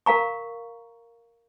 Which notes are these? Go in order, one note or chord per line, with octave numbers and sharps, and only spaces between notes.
A#4 F5 A#5 C#6